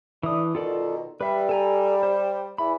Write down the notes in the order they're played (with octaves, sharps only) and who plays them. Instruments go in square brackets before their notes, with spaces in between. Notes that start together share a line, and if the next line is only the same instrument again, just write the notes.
[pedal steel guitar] E3 D#6 [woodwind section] A3 D4
[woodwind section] B2 D#3 [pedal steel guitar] F4 A4 D5
[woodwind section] G3 [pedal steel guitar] B4 E5
[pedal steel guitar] A4 G#5 A#5
C5
[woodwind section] E2 E3 [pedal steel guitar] B5